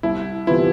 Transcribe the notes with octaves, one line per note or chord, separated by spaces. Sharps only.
C2 E4
C3 E3 B3 E4 F4